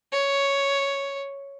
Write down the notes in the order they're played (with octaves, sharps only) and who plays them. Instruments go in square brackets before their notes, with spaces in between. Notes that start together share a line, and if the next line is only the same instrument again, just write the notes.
[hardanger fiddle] C#5